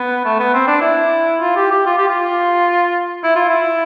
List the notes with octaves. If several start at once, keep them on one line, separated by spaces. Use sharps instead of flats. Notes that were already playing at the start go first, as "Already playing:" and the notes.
Already playing: B3
A3
B3
C4
D4
E4
F4
G4
G4
F4
G4
F4
E4
F4
E4